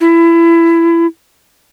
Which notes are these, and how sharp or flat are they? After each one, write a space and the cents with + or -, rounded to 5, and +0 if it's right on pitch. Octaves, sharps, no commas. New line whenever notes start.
E4 +25